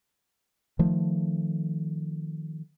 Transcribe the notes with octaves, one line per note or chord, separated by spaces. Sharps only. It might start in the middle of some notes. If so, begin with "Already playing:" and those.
D#3 F3 A3